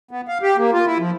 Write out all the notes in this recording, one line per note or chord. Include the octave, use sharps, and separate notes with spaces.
B3
F5
G4
A#3
F4
E4
F3